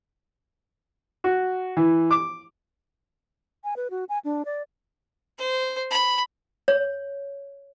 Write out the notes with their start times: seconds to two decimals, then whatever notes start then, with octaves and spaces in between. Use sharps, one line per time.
1.24 F#4
1.77 E3
2.11 D6
3.64 G#5
3.76 B4
3.91 F#4
4.09 G#5
4.25 D4
4.45 D5
5.38 C5
5.91 B5
6.68 C#5